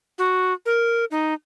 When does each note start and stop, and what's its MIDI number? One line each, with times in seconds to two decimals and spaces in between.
0.18 0.53 66
0.66 1.05 70
1.11 1.34 63